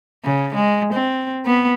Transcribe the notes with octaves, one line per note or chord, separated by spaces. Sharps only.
C#3
G#3
C4
B3